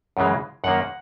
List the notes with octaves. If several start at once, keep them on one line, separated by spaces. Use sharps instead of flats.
F#2 C#3 E3 G#3
F#2 D#3 A#3 F#5